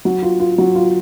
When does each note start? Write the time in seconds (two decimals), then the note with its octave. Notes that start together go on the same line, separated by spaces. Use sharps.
0.05 F#3
0.22 F4
0.40 F4
0.58 F#3
0.75 F4